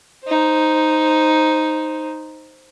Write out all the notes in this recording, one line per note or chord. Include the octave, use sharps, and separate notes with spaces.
D#4 C5